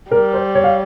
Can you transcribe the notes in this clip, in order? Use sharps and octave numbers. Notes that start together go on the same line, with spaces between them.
G3 A#4
C5
C#5
F5